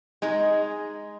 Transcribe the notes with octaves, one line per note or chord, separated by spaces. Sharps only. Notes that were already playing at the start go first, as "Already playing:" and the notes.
G#3 D#4 G#4